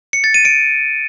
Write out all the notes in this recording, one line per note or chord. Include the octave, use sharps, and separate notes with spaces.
C#7
A6
D#7
D7